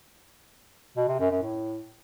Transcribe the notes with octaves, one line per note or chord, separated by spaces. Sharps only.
B2
C3
F#2
F#2
A2